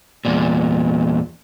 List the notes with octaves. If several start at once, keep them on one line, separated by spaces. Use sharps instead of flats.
E2 A#2